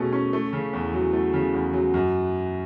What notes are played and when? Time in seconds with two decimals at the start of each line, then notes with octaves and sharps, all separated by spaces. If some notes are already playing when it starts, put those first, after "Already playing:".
Already playing: B2 A3 C#4 G#4
0.13 C#4
0.33 A3
0.53 C#3
0.73 E2
0.93 F#3
1.13 A3
1.33 C#3
1.54 E2
1.73 F#3
1.94 F#2